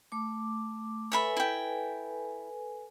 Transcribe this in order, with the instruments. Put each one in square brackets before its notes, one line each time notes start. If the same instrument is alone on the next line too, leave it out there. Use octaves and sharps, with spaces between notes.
[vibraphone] A3 D6
[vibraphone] A4 B4 G#5 [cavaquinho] C#5 E5 B5
[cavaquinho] E4 G5